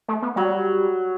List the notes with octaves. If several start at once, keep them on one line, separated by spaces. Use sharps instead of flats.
A3
B3
F#3 G3